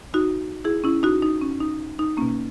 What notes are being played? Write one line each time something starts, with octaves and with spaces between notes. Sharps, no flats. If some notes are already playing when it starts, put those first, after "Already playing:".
D#4 F#4
E4 G#4
C#4 E4
D#4 F#4
D#4
C#4
D#4
D#4
B2 A#3 C#4